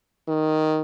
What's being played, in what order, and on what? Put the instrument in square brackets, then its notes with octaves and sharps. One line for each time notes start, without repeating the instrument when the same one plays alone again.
[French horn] D#3